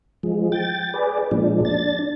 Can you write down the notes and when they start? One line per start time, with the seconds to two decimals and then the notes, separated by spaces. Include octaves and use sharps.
0.23 F3 G#3
0.52 G5 A6
0.94 G#4 B4 D5
1.31 A#2 F3 G#3 D4
1.65 D4 A6